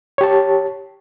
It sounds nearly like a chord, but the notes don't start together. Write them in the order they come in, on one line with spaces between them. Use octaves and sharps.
C#5 G4 A5